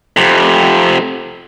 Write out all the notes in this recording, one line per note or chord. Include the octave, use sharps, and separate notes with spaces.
F2 C3